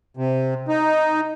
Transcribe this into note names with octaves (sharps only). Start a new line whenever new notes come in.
C3
D#4